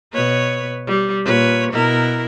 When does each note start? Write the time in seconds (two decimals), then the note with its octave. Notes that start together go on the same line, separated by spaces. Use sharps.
0.13 B2 B4 C#5
0.87 G3
1.25 A#2 B4 C#5
1.72 B2 E4 A#4